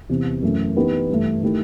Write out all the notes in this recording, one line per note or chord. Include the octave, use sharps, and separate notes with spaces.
E2 C3 E3
F#2 E3 A3
E3 B3 D#4 G4
G2 E3 A3
D#3 A3 E4 G4